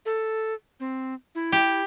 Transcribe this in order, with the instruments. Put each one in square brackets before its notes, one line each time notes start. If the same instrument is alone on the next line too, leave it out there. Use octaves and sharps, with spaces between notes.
[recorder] A4
C4
E4
[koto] G4